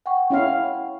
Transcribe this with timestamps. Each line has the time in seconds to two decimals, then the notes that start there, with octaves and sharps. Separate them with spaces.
0.06 F#5 G5 C#6
0.30 C#4 E4 F5